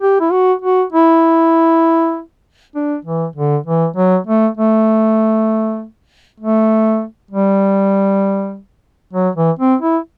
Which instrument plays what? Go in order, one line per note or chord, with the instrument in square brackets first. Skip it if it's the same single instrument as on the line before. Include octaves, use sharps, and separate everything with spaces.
[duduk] G4
E4
F#4
F#4
E4
D4
E3
D3
E3
F#3
A3
A3
A3
G3
F#3
E3
C4
E4